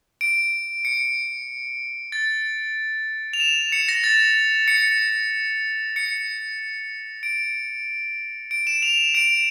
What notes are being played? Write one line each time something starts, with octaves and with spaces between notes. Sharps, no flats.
D7
C#7
A6
F7
E7
C#7
A#6
A6
C#7
C#7
D7
D7
E7
F7
D7